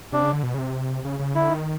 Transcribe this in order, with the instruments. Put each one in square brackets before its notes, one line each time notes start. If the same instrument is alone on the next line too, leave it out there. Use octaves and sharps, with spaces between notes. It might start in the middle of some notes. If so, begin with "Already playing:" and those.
[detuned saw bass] C3 [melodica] D4
[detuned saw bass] C#3
D3
B2
C#3
C3
C#3
C#3
[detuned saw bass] D3 [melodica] E4
[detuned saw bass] D#3